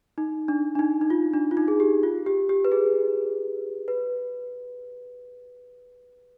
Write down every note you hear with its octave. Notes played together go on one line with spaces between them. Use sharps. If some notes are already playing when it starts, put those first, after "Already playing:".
D#4
D4
D4
D#4
D#4
F4
D4
F4
D#4
G#4
G4
F4
G4
G4
B4
G#4
B4